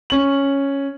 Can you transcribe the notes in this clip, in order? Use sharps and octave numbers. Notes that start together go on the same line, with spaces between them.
C#4 F#7